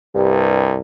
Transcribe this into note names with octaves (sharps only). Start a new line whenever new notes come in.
C2 G2